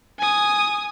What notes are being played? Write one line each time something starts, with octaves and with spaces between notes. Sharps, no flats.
G#5 D#6